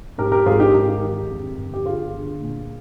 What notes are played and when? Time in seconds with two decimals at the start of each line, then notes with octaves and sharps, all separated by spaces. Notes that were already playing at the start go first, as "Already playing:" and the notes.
0.18 G#2 G4 A#4
0.32 G4 A#4
0.46 G#1 F4 G#4
0.60 D#4 G4
0.74 G#1 G4 A#4
1.03 D#3
1.31 F2
1.58 G1
1.74 G4
1.86 G1 F4 G#4
2.14 D3
2.42 A#2